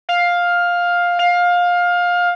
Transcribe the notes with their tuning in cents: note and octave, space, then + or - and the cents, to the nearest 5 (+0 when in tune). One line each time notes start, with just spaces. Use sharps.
F5 +10
F5 +20